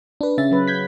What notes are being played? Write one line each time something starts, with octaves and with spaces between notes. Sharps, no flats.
D4 B4
C#3 C#4 E5 A6
F#3 B4
G6 G#6 B6